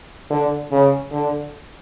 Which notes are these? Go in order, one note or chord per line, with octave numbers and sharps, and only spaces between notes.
D3
C#3
D3